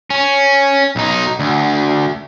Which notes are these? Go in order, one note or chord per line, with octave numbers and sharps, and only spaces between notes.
C#4
B1 D#4
D2